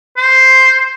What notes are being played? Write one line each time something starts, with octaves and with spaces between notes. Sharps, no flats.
C5